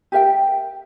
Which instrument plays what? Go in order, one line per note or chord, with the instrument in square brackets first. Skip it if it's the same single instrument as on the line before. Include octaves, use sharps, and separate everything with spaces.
[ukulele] G4 A#4 E5 G5